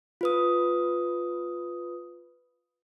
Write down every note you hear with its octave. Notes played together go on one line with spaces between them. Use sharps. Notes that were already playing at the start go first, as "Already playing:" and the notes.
F4 B4 D#6